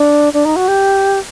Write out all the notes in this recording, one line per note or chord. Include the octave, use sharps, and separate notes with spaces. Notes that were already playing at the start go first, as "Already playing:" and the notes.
Already playing: D4
D4
D#4
F#4
G4